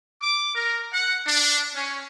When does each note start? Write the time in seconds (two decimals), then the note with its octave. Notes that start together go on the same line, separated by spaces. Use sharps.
0.21 D6
0.55 A#4
0.92 F#5
1.26 D4
1.75 C#4